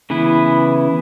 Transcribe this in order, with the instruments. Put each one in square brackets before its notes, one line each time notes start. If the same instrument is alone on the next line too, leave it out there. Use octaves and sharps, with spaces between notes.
[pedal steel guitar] C#3 E3 B3 E4